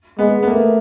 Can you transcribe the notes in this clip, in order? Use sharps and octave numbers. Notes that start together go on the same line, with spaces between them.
G#3 B3
B3
A3 A#3